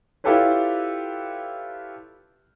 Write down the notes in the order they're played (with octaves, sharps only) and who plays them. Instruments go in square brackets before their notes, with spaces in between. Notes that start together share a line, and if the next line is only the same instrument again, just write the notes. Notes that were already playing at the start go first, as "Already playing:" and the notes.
[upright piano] E4 F4 G4 A4 B4 C#5